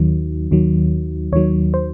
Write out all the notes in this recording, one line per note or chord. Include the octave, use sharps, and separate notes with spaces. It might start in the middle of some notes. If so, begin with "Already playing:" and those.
Already playing: D#2 D#3 F#3
D#2 D#3 F#3
D#2 D#3 F#3 C#5
C5